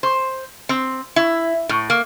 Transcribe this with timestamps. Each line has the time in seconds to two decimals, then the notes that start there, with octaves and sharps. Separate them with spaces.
0.03 C5
0.69 C4
1.16 E4
1.69 A2
1.90 A#3